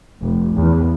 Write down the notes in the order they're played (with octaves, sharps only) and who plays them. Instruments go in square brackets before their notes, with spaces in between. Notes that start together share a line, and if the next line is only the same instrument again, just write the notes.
[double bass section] F1
E2